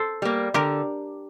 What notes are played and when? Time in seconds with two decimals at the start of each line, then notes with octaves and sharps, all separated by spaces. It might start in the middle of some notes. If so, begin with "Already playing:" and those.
Already playing: A4 C5
0.22 G3 A#3
0.54 D3 G4 A#4